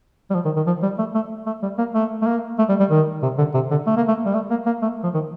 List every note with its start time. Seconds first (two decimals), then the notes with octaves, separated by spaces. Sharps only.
0.30 G3
0.34 F3
0.45 D#3
0.56 D#3
0.66 F3
0.82 G3
0.98 A3
1.15 A3
1.46 A3
1.62 G3
1.78 A#3
1.94 A3
2.21 A3
2.26 A#3
2.58 A3
2.69 G3
2.80 G3
2.90 D#3
3.22 C3
3.38 D3
3.54 C3
3.71 D3
3.86 A3
3.97 A#3
4.08 A3
4.25 G3
4.34 A3
4.50 A#3
4.66 A#3
4.82 A3
5.03 F3
5.14 D#3